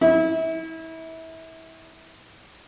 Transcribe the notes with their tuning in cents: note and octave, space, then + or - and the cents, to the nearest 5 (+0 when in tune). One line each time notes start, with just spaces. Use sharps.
E4 -30